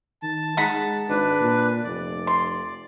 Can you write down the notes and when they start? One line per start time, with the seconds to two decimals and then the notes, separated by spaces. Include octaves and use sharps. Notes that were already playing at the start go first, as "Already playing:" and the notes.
0.22 D#3 A5
0.57 G#3 D#4 F#5 B5
1.09 G#1 D4 B4
1.40 A#2
1.84 F1 D5
2.27 C6